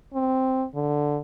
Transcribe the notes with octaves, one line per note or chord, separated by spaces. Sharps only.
C4
D3